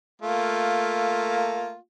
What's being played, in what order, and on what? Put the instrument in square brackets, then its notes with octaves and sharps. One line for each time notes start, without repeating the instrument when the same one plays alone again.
[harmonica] A3 A#3 F4